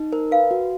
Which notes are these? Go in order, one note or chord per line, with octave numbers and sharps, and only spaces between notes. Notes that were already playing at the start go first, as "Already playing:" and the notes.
Already playing: D#4
A#4 C5
B4 F5
F#4